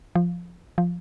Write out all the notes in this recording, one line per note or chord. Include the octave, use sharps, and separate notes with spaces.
F3
F3